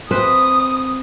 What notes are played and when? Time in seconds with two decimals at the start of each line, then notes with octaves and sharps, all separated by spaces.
0.11 C4 B4 D#6